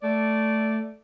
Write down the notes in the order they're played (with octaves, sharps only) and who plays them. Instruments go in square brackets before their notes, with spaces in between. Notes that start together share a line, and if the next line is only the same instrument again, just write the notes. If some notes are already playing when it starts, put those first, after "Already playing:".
[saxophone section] A3 D5